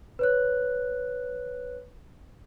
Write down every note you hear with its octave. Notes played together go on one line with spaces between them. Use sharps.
B4 C#5 F#6